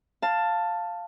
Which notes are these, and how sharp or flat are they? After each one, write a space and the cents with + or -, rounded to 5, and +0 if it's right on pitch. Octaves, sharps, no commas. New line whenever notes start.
F5 +0 A5 +10